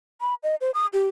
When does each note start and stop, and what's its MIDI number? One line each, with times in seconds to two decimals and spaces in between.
0.21 0.34 83
0.43 0.55 75
0.61 0.71 72
0.74 0.86 87
0.93 1.08 67